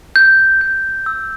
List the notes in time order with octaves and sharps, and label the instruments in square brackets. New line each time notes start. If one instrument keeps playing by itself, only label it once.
[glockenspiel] G6
G6
E6